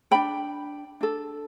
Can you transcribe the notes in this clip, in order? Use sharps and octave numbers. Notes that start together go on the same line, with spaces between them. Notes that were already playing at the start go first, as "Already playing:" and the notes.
D4 A4 G5 B5
D4 A4